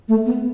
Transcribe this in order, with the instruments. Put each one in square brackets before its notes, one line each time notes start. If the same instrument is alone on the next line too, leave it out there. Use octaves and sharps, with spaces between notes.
[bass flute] A3
B3